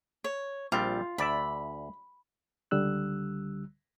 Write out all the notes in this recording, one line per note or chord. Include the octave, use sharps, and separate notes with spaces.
C#5
A#1 G3 C4 F4
D2 D5 E5 B5
C#2 D3 G3 E6 F#6